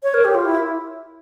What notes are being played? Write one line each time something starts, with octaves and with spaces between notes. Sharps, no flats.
C#5
A#4
G4
F4
E4